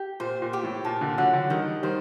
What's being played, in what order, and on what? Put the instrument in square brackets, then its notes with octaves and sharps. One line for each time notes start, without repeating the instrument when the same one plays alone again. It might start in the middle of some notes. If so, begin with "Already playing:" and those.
Already playing: [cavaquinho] G4
[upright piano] A#2 [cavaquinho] C5
[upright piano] A#2
[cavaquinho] G4
[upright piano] A2
[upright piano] A#2 [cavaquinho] A5
[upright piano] A#2 D3
[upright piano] D3 F#3 [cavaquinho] F#5
[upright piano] D3 F#3
[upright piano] D#3 G3 [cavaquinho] D#5
[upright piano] D#3 G3 [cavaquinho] C5